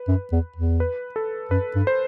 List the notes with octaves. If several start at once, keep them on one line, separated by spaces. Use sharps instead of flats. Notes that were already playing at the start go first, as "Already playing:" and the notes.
Already playing: B4
F#2
E2
E2
B4
A4
F#2 B4
G2
C5